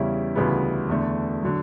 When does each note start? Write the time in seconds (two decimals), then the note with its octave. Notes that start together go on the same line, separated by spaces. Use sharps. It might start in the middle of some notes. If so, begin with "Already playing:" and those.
Already playing: E2 C#3 G3 C#4 E4
0.35 D2 C#3 E3 G3 B3
0.89 E2 D3 A3 D4
1.43 D3 F#3